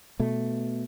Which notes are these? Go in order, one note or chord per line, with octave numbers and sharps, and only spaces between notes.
B2 A3